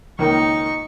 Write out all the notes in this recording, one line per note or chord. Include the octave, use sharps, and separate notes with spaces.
C#2 D#3 A#3 D#4 C#6